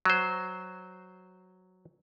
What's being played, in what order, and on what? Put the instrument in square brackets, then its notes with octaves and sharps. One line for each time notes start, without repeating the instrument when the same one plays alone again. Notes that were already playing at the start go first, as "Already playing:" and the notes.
[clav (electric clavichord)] F#3 C5